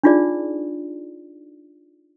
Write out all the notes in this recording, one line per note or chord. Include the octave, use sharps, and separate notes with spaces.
D4 D#4 F4 G#4 D5